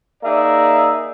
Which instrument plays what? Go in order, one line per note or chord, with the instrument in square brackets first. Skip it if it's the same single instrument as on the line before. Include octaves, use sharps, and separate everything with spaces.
[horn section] A#3 D#4 G#4 D5 E5